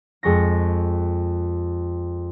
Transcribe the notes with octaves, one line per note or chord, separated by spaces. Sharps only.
F2 G#3 C#6 A#6